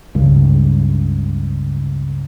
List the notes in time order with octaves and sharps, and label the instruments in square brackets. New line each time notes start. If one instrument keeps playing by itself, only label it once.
[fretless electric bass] C#2 G2 C#3